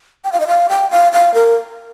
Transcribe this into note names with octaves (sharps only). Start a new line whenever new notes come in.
G5
F5
D#5
F5
G5
F5
F5
A#4